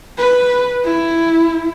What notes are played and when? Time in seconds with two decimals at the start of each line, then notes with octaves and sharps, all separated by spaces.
0.18 B4
0.85 E4